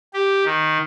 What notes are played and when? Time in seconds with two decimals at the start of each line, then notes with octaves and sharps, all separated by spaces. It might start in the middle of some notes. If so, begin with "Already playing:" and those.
0.14 G4
0.45 D#3